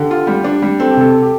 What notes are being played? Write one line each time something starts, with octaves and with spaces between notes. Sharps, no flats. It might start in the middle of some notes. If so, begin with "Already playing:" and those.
Already playing: D3 G4
F4
G3
D4
G3
C4 A4
G4
C3 A4
G4